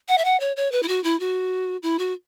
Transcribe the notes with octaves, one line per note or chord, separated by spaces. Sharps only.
F#5
E5
F#5
C#5
C#5
B4
E4
F#4
E4
F#4
E4
F#4